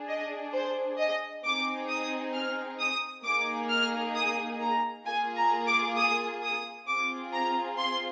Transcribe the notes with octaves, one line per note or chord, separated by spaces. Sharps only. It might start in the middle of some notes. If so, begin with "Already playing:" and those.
Already playing: D4 G#4
D#5
C5
D#5
C4 D#4 G#4 D6
D#6
F6
D#6
A#3 D#4 G#4 D6
F6
D#6
A#5
A#3 F4 G#4 G#5
A#5
D6
D#6
D#6
C4 F4 G#4 D6
A#5
C6